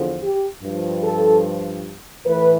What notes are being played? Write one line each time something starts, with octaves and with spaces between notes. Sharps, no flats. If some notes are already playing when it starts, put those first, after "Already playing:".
Already playing: E2 D3 F3
G4
G2 F3
A4
A2 E3 B4